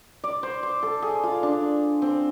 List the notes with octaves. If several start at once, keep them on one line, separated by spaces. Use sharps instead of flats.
D5
C5
C5
A4
G#4
F4
D4
C4